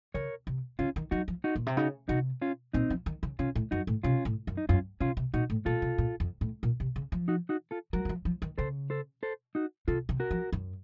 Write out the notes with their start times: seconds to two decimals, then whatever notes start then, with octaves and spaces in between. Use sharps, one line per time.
0.14 C#3 A#4 C#5
0.47 C3
0.79 C#3 C#4 F4
0.96 D#3
1.11 F#3 D#4 F#4
1.28 F3
1.44 D#4 F#4
1.56 A#2
1.66 C3
1.77 C#3 D#4 F#4
2.09 C3 D#4 F#4
2.42 C#4 F4
2.73 A#2 C4 D#4
2.90 F3
3.06 D#3
3.23 C#3
3.39 C3 C#4 F4
3.55 A2
3.71 F#2 D#4 F#4
3.87 A2
4.03 C3 C#4 F4
4.25 A2
4.47 F#2
4.57 D#4
4.69 F#2 C#4 F4
5.00 C3 C#4 F4
5.17 C3
5.34 A#2 D#4 F#4
5.50 A2
5.66 A#2 F4 A4
5.82 C3
5.98 A#2
6.20 F2
6.41 A2
6.63 A#2
6.80 C3
6.96 C#3
7.12 F3
7.28 D#4 F#4
7.49 D#4 F#4
7.71 F4 A4
7.93 F#3 F#4 A#4
8.05 D#3
8.09 F3
8.25 F3
8.42 D#3
8.58 C#3 A4 C5
8.90 A4 C5
9.23 A4 C5
9.55 D#4 F#4
9.88 C3 F4 A4
10.09 C3
10.20 F#4 A#4
10.31 F3
10.52 F#2